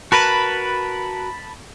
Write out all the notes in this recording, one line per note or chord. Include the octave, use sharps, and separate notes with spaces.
F#4 A#4 B4 A5 B5